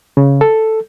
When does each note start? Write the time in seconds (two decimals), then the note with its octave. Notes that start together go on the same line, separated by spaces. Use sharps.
0.17 C#3
0.41 A4